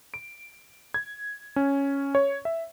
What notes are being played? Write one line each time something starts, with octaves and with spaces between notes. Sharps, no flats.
D7
G#6
C#4
C#5
E5